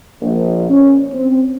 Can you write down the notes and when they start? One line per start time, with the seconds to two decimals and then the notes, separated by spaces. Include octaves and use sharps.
0.22 A#1
0.70 C#4
1.13 C4